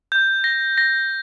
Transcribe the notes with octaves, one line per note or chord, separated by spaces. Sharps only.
G6
A#6
A#6